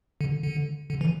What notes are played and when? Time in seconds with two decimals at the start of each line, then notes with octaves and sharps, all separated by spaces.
0.21 D3
0.43 D3
0.90 D3
1.01 E3